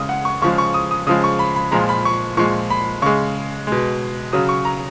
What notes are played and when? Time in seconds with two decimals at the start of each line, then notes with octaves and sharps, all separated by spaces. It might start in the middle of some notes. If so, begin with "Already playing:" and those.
Already playing: C#3 G#3 D#6
0.09 F#5
0.25 C#6
0.42 C#3 F3 G#3 C#6
0.58 C#6
0.74 D#6
0.91 D#6
1.07 C#3 F3 G#3 D#6
1.24 C#6
1.39 B5
1.56 B5
1.72 A#2 F3 G#3 A#5
1.89 B5
2.05 C#6
2.37 A#2 F3 G#3 C#6
2.70 B5
3.02 C#3 G#3 C#6
3.67 B2 G#3
4.33 C#3 F#3 D#6
4.49 C#6
4.65 A#5